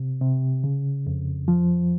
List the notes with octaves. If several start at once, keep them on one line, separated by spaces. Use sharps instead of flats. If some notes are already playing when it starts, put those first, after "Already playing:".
Already playing: C3
C3
C#3
F2
F3